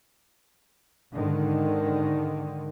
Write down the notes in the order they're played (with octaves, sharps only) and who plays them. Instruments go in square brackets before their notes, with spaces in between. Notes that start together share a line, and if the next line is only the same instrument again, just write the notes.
[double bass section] G#2 D3 D#3